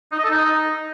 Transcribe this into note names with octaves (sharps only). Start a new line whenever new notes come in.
D#4
D#5
A4
D#4